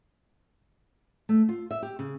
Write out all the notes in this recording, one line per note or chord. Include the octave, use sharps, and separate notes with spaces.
A3
F4
E5
G4
C#3